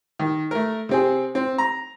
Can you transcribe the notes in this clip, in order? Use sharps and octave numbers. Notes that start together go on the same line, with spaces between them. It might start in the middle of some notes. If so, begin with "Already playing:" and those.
D#3
A3 A#4
C3 C4 G#4
C4
A#5